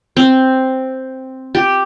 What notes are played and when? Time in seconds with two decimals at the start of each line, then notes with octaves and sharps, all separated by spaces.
0.17 C4
1.55 G4